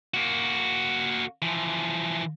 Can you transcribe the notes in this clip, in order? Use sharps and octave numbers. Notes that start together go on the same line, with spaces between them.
A#3 F#4
E3 F3